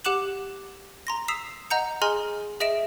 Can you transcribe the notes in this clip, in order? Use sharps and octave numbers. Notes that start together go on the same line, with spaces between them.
G4 F#5 D6 F#6 E7 F#7
A#5 C6 A#6
D#6 E6 B6 C7 E7 F7
D#5 F#5 A#5 G6 C#7
G#4 D#5 G#5 A#5 C6 F6
G#4 D#5 E5 A#6 D7 E7